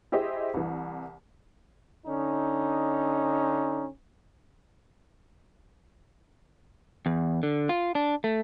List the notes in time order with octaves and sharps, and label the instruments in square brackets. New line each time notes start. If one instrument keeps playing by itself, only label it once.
[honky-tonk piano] E4 G4 G#4 C5 D#5 E5
C2 E3
[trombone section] D3 C#4 D#4
[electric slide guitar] E2
D3
F4
D4
A3